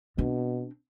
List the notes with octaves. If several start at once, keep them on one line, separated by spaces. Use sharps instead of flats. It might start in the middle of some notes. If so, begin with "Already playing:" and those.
B2 C4 D4